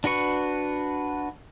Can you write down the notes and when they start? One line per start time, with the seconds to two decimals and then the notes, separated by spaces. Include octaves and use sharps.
0.04 D4 F#4 B4 C#6